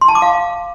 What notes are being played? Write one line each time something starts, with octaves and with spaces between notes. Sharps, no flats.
C6
A5
D6
F5